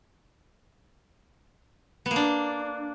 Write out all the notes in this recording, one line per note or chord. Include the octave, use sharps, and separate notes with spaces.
B3
A#3
D4